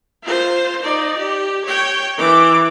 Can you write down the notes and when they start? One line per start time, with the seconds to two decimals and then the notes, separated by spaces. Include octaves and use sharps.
0.23 F4 C5
0.82 D#4 D5
1.18 G4
1.65 C#5 G5
2.17 E3 D6